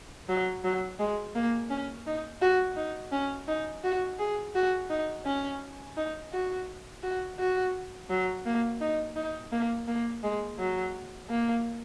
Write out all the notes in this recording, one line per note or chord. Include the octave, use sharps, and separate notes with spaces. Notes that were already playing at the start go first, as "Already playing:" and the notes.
F#3
F#3
G#3
A#3
C#4
D#4
F#4
D#4
C#4
D#4
F#4
G#4
F#4
D#4
C#4
D#4
F#4
F#4
F#4
F#3
A#3
D#4
D#4
A#3
A#3
G#3
F#3
A#3